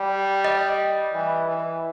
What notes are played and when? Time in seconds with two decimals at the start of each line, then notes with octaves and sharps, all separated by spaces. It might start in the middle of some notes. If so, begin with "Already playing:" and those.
Already playing: G3
0.45 D#5
1.14 E3
1.48 E3